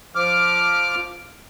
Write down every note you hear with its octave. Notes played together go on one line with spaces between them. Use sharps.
F3 D6 F6